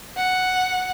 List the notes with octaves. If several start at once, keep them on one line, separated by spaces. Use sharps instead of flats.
F#5